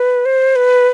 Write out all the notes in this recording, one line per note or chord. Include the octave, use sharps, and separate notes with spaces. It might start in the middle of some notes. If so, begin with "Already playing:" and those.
Already playing: B4
C5
B4